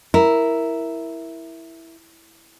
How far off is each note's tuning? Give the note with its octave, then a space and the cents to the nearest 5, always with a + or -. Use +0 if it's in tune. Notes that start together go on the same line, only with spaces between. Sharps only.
E4 +0 A#4 +0